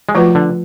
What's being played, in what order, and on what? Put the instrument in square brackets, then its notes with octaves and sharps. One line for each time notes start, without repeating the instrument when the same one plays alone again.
[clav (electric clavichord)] G#3
[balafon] F3 A3 F4 B4 [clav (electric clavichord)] F#3
[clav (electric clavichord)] D3